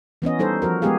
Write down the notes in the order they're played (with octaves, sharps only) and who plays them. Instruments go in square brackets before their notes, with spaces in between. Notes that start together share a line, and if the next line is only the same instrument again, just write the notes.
[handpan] E3 B3 C#4 D#5
G3 D#4 A4 C5
F3 F#4 A#4
G#3 B3 G4 G#4 F5